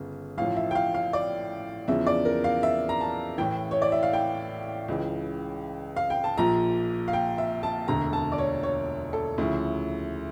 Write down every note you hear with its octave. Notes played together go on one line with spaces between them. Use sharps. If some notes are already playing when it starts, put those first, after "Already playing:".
Already playing: G1 C#3
A1 A2 F3 F5
E5
G5
F5
F5
D5
E2 C#3 F3 E5
D5
A#4
F5
E5
A#5
A5
A1 A2 E3 G5
C#5
D5
E5
F5
G5
C#2 C#3 E3
F5
G5
A5
A#1 A#2 F3 A#5
F5
G5
E5
A5
E1 D2 D3 A#5
A5
D5
C#5
C#5
A4
D2 C#3 F3 E4